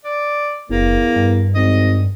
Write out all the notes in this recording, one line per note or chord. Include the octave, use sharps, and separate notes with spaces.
D5
F#1 E2 A#3
G2
G#1 D#5